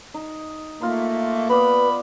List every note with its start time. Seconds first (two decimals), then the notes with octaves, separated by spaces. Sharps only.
0.14 D#4
0.81 A3 A#3 F4 B5 C6
1.50 B3 B4 D5 B5